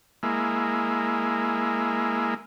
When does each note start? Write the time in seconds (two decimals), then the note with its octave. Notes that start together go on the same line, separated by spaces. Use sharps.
0.23 G#3 A#3 E4